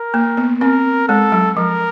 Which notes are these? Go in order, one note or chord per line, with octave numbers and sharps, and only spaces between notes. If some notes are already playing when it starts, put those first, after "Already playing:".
Already playing: A#4
A#3
B3
C4 A#4
G#3 A4
F#3
F3 A#4